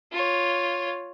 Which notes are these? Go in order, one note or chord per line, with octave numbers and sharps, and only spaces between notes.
F4 C#5